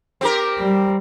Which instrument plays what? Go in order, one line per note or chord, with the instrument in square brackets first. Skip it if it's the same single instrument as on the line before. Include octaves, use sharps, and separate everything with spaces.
[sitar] C4 G4 A#4
[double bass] G3